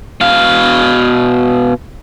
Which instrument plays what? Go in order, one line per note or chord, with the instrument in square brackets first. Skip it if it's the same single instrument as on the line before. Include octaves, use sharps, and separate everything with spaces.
[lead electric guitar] B2 F5